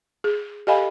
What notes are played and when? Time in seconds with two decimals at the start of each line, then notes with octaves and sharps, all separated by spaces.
0.24 G#4
0.67 G4 A4 D#5 F5 G#5 B5